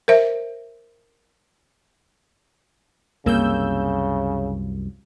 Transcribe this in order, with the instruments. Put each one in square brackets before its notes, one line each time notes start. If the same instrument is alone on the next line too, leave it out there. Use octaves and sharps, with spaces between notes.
[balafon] A#4 C5 E5
[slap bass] C2 F#2 [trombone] C#3 [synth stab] A#3 E6 G6